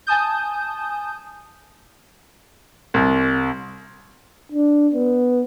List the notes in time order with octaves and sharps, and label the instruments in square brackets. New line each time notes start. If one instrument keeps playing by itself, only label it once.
[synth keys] G#5 A5 D#6 G6
[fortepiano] C2
[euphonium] D4
B3